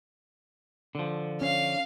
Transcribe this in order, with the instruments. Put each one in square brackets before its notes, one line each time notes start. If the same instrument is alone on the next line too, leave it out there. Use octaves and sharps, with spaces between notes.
[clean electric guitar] D3 F3
[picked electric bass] C#4 [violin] F5